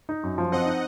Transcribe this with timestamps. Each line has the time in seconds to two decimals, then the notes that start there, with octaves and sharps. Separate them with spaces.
0.09 D#4
0.23 F#2
0.38 F3
0.52 C4 D#5 F#5
0.66 D#4